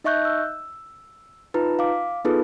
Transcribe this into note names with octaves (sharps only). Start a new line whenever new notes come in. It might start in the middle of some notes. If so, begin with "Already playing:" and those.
D#4 D#5 E5 C#6 F#6 G6
E6
D#4 F4 B4 A#5
F5 D6
B3 D#4 F4 G#4 A4 B4